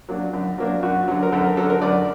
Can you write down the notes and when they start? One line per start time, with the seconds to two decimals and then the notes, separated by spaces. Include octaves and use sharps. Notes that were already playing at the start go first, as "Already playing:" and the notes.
0.09 F#3 A#3 D4
0.33 F#2
0.58 F#3 A#3 D4
0.83 F#2 F#4
1.08 D3 F#3
1.23 A#4
1.32 F#2 A4
1.45 A#4
1.57 D3 F#3 A4
1.70 A#4
1.82 F#2 D5